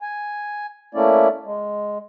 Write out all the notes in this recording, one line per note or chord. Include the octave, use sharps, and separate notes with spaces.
G#5
A3 A#3 C#4 E4 D5
G#3